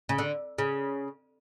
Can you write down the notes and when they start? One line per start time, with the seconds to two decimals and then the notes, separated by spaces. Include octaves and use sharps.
0.09 C#3
0.18 D3
0.58 C#3